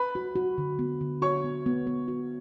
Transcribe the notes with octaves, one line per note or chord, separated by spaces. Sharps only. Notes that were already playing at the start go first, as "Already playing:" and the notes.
Already playing: B4 B5
F#4
F#4
D3
B3
D3
F#4 C#5 C#6
B3
B3
B3
F#4